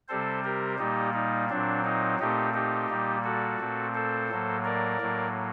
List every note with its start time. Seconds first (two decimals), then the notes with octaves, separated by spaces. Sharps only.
0.08 C3 G3 C4 A4 C5
0.44 G4 A#4
0.78 A#2 G3 A#3 D#4 G4
1.14 D#4
1.49 A#2 F#3 C4 D4
1.85 D#4
2.19 A#2 A3 C4 D#4 G4
2.54 D#4 G4
2.89 A#2 G3 A#3
3.24 F#4 A4
3.60 A#2 A3 C4
3.94 A4 C5
4.29 A2 F#3 A#3
4.64 A#4 D5
5.00 A2 F#3 A#3